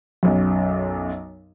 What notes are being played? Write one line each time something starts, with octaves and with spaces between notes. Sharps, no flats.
B1 F#2